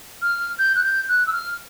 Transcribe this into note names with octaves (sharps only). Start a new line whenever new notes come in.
F6
G6
F#6
G6
F#6
E6
F6